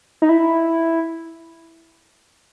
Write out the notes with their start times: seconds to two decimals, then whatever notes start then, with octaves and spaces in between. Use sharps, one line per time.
0.22 D#4
0.29 E4